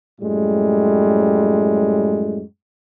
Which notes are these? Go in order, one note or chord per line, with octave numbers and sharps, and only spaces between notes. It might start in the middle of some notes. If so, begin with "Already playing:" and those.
F#2 A2 G3 G#3